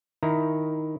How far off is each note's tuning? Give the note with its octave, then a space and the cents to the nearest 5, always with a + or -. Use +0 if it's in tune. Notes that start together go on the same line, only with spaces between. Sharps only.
D#3 +5 E4 +0 A#5 +0